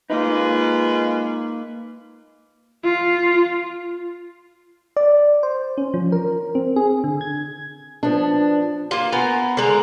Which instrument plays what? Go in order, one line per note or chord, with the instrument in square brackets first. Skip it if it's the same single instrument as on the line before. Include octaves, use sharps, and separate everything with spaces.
[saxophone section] G#3 F4 B4 [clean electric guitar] A#3 D#4
[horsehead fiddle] F4
[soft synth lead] D5
C5
C#4
F3
A#4
C4
G#4
D3
G#6
[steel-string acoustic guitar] F3 B3 D4
[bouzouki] A#3 F4
B3 A#4 G#5
D3 G#3 A#5